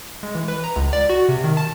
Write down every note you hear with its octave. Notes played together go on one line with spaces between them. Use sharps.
G#3
E3
B4
A#5
C#2
D5
F#4
C3
D#3
A5